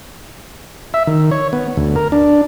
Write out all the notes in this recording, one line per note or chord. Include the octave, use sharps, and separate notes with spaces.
E5
D#3
C#5
B3
D2
A#4
D4